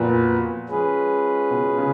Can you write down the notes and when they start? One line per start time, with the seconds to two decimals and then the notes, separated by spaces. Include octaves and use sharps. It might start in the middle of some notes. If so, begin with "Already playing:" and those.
Already playing: F2 A#2 F3 B3 F#4 B4
0.69 F3 G#3 C#4 G#4 B4
1.51 B2
1.78 C#3